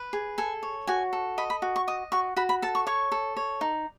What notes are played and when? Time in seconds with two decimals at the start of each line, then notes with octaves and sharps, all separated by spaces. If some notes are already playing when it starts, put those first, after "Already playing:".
Already playing: B4
0.13 G#4
0.38 A4 G#5
0.63 C#5
0.87 F#4 G#5
1.13 A4
1.38 D#5 B5
1.50 B5
1.62 F#4
1.76 C#6
1.88 D#5 D#6
2.12 F#4 C#6
2.37 F#4 B5
2.49 B5
2.62 A4 A5
2.75 C#6
2.87 C#5 C#6
3.12 A4
3.37 C#5
3.61 D#4